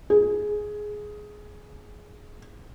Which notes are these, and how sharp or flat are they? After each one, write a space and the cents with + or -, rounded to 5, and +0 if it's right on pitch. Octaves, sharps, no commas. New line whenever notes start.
G#4 +10